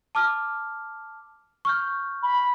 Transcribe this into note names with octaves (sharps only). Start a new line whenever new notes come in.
A5 D6 F6
C#6 F6 G6
B5